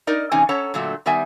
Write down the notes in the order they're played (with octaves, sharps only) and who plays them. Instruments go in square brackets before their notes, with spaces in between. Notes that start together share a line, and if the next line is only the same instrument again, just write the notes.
[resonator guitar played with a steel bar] D#4 A#4 D5 D#5
E2 C3 E3 C#4 D#4 G#5
C#4 A4 C#5 F#5 A5 A#5
A#2 D3 F#3 A3
D#3 G3 B3 E5 G#5